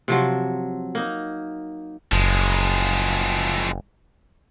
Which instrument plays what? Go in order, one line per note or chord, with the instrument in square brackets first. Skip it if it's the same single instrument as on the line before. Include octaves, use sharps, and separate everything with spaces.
[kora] C3 F3 F#3
A#3 D#4
[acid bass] F#1 [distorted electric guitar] F3 G#3